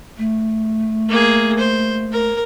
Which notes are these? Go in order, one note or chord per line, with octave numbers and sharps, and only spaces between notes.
A3
A#3 G#4
C5
A#4